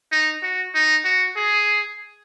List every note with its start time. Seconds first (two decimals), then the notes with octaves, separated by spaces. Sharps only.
0.12 D#4
0.43 F#4
0.74 D#4
1.05 F#4
1.36 G#4